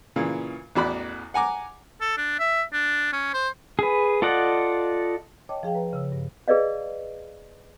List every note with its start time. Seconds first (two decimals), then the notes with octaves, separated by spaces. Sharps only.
0.16 A#2 C#3 E3
0.75 A1 E2 F#4 D5 B5
1.34 F#5 G#5 A#5 D6
2.01 A4
2.18 D4
2.40 E5
2.73 D4
3.13 C#4
3.34 C5
3.79 G#4 B4
4.22 F4 A4 D5 D#5 F#5
5.49 C#5 D#5 G5 A5 D6
5.63 F3 G#4 F5 G5
5.75 B4 A#5
5.93 C#3 E6
6.12 G2
6.48 G#4 B4 D5 D#5 F5